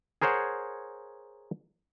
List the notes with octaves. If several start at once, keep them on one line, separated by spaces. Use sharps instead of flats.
G#4 A#4 C5 C#5 F#5